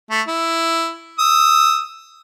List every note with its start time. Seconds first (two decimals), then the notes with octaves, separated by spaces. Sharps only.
0.10 A3
0.28 E4
1.19 D#6 E6